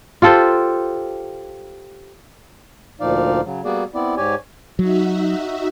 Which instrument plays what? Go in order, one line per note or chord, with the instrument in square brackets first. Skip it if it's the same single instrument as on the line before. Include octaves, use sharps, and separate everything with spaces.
[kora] F4 G4 A4 C5
[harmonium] D2 A#2 F3 D#4 D5 F5
C#3 F#3
G3 A#3 B3 F#4 G#4 D5
B3 C4 E4 D5
G#2 G4 C#5 D5 G#5
[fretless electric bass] F#3 [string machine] D#4 F#4 E5